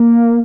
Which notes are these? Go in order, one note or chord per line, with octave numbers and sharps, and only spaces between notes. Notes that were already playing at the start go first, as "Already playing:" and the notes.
Already playing: A#3